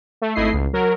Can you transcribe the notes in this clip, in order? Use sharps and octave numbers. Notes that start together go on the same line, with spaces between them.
A3
G#1 A3 E4 D#5 C7
C#2
F#3 A#4